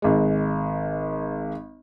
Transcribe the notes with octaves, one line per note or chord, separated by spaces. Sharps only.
G#1 G#3